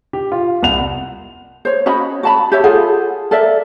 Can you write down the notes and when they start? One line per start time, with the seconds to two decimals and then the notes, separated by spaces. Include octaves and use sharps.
0.13 G4
0.32 F4
0.63 C2 F#5 F7
1.65 C5 C#5
1.86 C#4 F#4 D#5 B5
2.23 F#4 A5 B5
2.52 G4 C#5 E5
2.64 F4 G#4 A4 F#5
3.31 A4 A#4 D5 E5